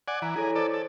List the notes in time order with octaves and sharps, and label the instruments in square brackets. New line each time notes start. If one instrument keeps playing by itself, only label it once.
[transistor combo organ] D5 F#5 G#5
[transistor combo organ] E3 [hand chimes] A#5 D7
[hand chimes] E4 A4 C#5 [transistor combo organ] G#4
[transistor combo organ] A4 D5 [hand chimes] C5
[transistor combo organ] A4